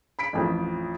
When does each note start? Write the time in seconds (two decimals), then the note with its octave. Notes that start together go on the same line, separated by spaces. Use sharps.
0.19 B5 B6 D7
0.33 A1 F2 F3